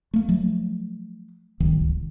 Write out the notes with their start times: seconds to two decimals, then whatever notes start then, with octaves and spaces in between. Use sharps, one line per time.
0.14 A3 A#3
0.29 F3 F#3 A3
1.60 D1 G1 C#2 D#3